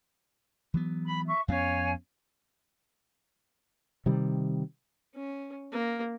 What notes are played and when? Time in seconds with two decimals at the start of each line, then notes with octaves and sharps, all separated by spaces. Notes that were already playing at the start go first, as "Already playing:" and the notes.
0.74 E3 F#3 B3
1.04 B5
1.26 E5 C#6
1.48 F2 B3 C#4 C#5 F5 G#5
4.06 C3 D#3 G3
5.14 C#4
5.72 A#3